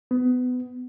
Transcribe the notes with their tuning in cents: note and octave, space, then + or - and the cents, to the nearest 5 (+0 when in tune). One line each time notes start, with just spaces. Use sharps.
B3 +25